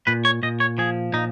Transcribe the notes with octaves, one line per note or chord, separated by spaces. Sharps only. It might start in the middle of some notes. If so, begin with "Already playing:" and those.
A#2 B4
C#5
A#2 D#5
C#5
F3 G#4
A#2 D#4